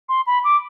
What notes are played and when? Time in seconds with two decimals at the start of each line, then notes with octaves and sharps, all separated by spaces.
0.09 C6
0.27 B5
0.44 D6